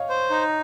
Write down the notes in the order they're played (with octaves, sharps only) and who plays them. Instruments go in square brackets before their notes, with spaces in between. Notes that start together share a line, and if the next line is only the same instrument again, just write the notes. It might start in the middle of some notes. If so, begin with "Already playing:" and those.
Already playing: [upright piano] C#5 D#5 F5
[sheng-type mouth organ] C5
D#4